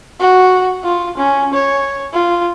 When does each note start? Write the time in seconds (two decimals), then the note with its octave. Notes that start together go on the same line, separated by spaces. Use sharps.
0.20 F#4
0.84 F4
1.17 C#4
1.54 C#5
2.13 F4